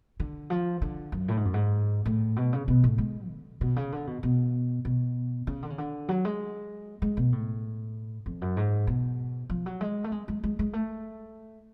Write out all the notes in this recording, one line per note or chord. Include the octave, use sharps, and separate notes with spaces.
D3
F3
D3
F#2
A2
G#2
F#2
G#2
A2
B2
C#3
B2
A2
G#3
D3
B2
C#3
D3
B2
B2
B2
C#3
D3
C#3
D3
F#3
G#3
G#3
B2
A2
F2
F#2
G#2
B2
F3
F#3
G#3
A3
G#3
G#3
G#3
G#3
A3